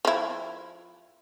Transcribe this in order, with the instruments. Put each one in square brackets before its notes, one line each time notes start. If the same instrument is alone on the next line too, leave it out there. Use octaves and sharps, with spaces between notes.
[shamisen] F3 E4